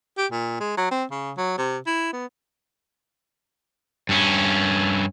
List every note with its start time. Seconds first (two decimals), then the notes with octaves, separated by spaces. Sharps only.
0.18 G4
0.32 A#2
0.60 G#3
0.78 F#3
0.91 C4
1.11 C#3
1.37 F#3
1.58 C3
1.87 E4
2.13 B3
4.09 G2 C#4